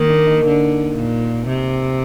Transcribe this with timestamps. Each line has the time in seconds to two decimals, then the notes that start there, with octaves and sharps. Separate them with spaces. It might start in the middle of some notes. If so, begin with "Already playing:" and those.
Already playing: D#3 A#3
0.09 D4
0.27 D#4
0.45 D3
0.95 A#2
1.47 C3